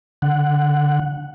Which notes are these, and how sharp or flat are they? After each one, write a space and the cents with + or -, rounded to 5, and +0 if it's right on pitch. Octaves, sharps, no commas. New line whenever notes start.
D3 -10 F#5 +0